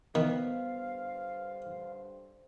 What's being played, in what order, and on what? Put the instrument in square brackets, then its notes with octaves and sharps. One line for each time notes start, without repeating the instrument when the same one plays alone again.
[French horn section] G2 D3 C5 [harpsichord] D#3 [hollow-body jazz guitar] B3 [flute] F5